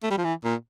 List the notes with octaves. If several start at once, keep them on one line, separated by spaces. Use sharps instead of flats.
A3
G3
F3
E3
A#2